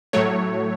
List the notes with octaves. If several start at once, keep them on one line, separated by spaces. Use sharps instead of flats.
A2 F#3 A3 C#5